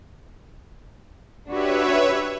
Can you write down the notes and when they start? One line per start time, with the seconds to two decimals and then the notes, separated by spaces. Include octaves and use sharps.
1.49 D4 F#4 G4 B4 C#5 E5